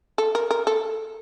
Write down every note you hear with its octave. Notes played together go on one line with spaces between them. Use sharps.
A4
A#4
A#4
A4